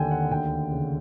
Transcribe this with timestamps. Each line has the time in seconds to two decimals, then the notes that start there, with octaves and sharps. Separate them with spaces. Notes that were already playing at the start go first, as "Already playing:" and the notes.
Already playing: D#2 D3 G5 G#5
0.11 F#5
0.31 D2 G5
0.72 C#3